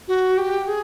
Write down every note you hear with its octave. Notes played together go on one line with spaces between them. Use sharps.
F#4
G4
G#4